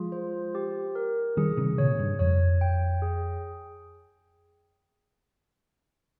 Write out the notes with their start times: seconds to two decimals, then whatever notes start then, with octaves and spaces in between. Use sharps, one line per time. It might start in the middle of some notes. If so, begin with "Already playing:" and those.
Already playing: F3 G#3 F4 G#4
0.12 C5
0.55 G4
0.95 A#4
1.37 D#3 G3 G#4
1.57 C3 D#3
1.78 A#2 C#3 C#5
1.99 G2
2.19 F2 C#5
2.61 G5
3.02 G#4